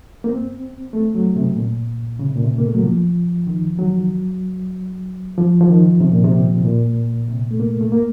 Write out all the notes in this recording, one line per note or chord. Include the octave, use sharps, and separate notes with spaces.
A#3
C4
A3
F#3
C3
A#2
C#3
C3
A#2
C3
A#3
A3
F#3
F3
D#3
F#3
F3
F3
D#3
C3
A#2
C3
A#2
C3
A3
A#3
A3
A#3